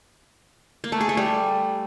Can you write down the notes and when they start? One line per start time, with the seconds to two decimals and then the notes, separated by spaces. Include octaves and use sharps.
0.84 A#3
0.92 A3
1.01 G#4
1.09 A3
1.17 G3